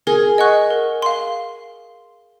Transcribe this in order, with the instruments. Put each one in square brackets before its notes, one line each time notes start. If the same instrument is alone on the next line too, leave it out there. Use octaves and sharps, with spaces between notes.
[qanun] G#4 [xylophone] A#4
[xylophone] D#5 F#5 C#6 F#6
A#4
F5 C6